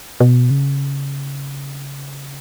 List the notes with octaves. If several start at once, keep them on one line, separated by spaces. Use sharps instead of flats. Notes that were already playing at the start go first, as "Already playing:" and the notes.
B2
C#3